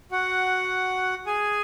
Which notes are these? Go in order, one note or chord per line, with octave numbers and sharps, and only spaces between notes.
F#4 F#5
G#4 G#5